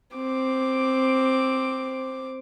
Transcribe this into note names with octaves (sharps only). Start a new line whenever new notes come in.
C4 D6